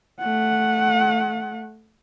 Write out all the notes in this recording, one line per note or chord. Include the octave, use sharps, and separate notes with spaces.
A3 F#5